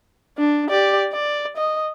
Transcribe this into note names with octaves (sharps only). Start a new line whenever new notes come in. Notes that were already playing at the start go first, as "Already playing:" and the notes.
D4
G4 D5
D5
D#5